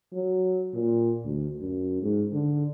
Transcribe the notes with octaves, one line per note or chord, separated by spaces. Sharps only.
F#3
A#2
D2
F#2
G#2
D3